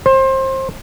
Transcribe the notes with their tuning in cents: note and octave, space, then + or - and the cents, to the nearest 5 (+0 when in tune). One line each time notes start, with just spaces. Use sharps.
C5 +25